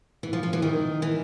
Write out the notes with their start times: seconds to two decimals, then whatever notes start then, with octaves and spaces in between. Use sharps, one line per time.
0.23 E3
0.33 F3
0.43 F3
0.53 E3
0.62 D#3
1.02 E3